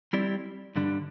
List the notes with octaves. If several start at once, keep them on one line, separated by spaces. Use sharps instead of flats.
G3 C4 E4 G4 D5
G2 D3 G3 D4